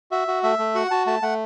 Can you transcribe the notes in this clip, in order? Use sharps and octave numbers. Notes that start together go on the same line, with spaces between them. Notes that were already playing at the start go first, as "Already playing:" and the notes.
F#4 E5
F#4
A3 E5
A3
F#4 F#5
F#4 A5
A3 A5
A3 F#5